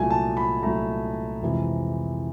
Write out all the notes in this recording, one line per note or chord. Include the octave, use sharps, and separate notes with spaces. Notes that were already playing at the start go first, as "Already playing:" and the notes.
Already playing: C2 A#2 F#3 A3 G#5
A5
B5
C2 A#2 F#3 A3 A#5
F2 C3 E3 G#3